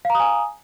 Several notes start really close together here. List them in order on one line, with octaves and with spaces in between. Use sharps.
F5 A#5 D#6 G#5